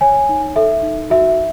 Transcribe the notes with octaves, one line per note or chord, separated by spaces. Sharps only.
C#5 G#5
D#4
A4 E5
D#4
F#4 E5